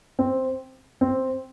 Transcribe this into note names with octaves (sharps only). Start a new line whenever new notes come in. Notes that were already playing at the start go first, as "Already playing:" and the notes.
C4
C4